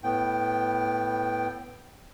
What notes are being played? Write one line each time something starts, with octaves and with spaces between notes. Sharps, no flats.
A2 B3 G5